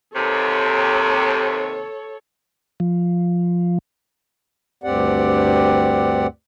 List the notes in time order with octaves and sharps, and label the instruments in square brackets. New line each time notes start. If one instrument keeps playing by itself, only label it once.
[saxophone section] D#2 C3 [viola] A4 C#5
[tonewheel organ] F3
[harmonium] D2 G2 C4 G4 D5 F#5